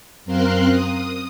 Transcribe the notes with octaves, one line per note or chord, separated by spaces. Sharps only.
F#2 C4 A#4 F5 C6 F#6
D#6